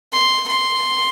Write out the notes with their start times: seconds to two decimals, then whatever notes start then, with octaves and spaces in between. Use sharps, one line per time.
0.13 C6
0.48 C6